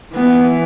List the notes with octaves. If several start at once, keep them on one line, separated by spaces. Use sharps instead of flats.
E3 B3